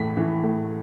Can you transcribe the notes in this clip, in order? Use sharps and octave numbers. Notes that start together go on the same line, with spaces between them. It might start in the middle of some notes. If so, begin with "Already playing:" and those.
Already playing: A2 E3 B6
E3
A2